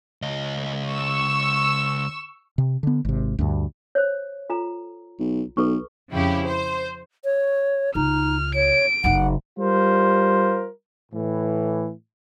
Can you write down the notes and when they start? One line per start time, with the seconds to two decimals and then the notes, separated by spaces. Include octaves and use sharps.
0.22 C#2 D#5
0.88 C#6 E6
2.58 C3
2.83 D3 B3
3.05 G#1 C3
3.39 D2 G2
3.95 C5 C#5
4.50 F4 A4 A#5
5.20 B1
5.57 B1 A4 B4 C#6
6.12 F2 C#3 E4 G4
6.45 C5
7.24 C#5
7.95 C#2 D#4 F6
8.55 C#5 D7
9.04 F#1 D#4 F#5
9.58 G3 F4 A#4 C5
11.12 A2 E3